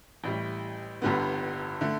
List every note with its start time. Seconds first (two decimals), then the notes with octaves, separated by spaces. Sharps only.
0.24 A1 A2 G3
1.02 G1 G2 D3 G3 B3
1.81 D3 A3